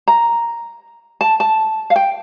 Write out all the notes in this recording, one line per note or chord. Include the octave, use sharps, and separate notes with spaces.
A#5
A5
A5
F5
G5